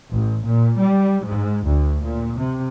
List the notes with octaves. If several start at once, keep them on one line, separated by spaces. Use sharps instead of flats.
A1
A#2
G3
G#2
D2
A#2
C3